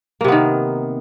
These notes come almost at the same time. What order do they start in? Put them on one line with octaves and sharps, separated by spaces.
A#3 C3 B3 D#3